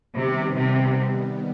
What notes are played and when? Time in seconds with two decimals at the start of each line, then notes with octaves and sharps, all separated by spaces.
0.16 C3 D#3 G3 B3
0.57 C3